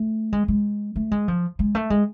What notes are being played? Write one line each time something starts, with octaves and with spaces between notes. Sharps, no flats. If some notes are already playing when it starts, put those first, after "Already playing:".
Already playing: A3
G#3
G#3
A3
G#3
F3
G#3
A3
G#3